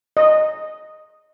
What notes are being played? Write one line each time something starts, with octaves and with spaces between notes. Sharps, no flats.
D#5